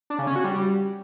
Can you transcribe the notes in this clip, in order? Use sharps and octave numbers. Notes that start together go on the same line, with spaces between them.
D4
C#3
C#4
F#4
G3